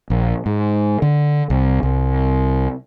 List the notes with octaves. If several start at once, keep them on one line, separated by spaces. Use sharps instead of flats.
A#1
G#2
D3
C2
C2